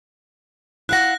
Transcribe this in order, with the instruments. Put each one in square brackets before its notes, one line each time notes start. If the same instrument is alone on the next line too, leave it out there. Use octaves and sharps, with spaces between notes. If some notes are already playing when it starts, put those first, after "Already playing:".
[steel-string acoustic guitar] E4 F5 F#5 [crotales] F#6 A#6